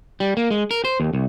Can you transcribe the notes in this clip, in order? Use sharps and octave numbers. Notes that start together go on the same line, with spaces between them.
G3
A#3
G#3
A#4
C5
D#2
C2